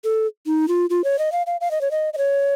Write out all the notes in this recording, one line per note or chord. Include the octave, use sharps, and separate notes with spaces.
A4
D#4
F4
F4
C#5
D#5
F5
F5
F5
D#5
C#5
D#5
D#5
C#5